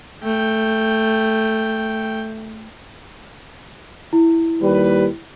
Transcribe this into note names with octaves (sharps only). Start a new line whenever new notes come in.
A3 G5
E4
D#2 G3 B4